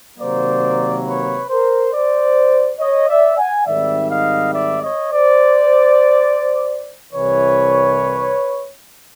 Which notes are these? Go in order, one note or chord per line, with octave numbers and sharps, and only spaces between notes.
C3 D#3 F#3 A#3 C5 D5
B4 C#5
A#4 C5
C5 D5
C#5 D#5
D5 E5
F#5 G#5
G#2 D#3 G3 C4 D5 E5
D#5 F5
D5 E5
C#5 D#5
C5 D5
C2 C3 E3 B4 C#5